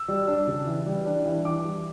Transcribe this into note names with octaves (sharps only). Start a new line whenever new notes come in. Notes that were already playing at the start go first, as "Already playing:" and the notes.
Already playing: E6
G3
D4
C#3
E3
G3
D4
E3
E3 D6
G3